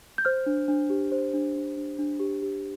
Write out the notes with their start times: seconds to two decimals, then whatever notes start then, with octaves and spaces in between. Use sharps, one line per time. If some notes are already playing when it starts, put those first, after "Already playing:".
0.18 G6
0.25 C5 F6
0.46 D4
0.68 D4
0.90 G4
1.12 C5
1.34 D4
1.56 D4
1.77 D4
1.99 D4
2.20 G4
2.42 G4